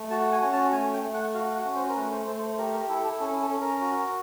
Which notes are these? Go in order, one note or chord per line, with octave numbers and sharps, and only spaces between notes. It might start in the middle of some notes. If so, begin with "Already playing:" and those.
Already playing: A3
F#4 A5
G#5
C#4
A5
A3 G#5
G5
A3
F#5
F#4 F5
F#5
C#4
C5
A#4
A3 B4
C5
A3 C5
C5
G4 A#4
A#4
E4 A4
A4
C#4 A4
A4
C#4
A#4
F#4